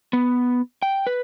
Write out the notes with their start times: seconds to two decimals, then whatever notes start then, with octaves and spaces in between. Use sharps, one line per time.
0.13 B3
0.82 G5
1.07 B4